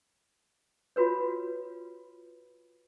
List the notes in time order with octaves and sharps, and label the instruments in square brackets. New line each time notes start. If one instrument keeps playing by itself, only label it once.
[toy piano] F4 F#4 B4 C#5